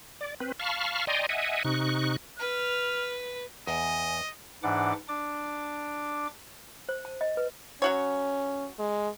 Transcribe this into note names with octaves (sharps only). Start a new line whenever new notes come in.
D5
C4 B4
F5 A5 B5 C#6 F6
D5 D#5 G5 G#5 A#5 C6
D#5 E5 F#5 G#5
C3 D#4 C#6 F#6
B4 F6
E2 D#5 G#5
G#2 E3 D4 F#5 D6
D4 D6
C5
A5
D#5
B4
F#3 C#4 F#4 C#5
G#3